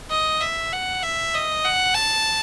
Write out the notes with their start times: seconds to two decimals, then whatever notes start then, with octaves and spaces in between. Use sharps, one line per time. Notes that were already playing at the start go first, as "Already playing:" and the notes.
0.11 D#5
0.40 E5
0.72 F#5
1.03 E5
1.34 D#5
1.64 F#5
1.95 A5